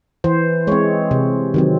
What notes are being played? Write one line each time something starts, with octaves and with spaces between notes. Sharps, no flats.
E3 C5
G#3 C4 C#5
C3
D#3 F#3 C4